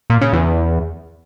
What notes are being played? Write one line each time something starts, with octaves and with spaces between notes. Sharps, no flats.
A#2
C#3
E2